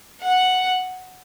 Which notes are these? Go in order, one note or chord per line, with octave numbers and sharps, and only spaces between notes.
F#5